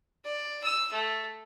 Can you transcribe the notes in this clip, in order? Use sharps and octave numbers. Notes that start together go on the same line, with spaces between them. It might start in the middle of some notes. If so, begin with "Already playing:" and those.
D5
E6
A3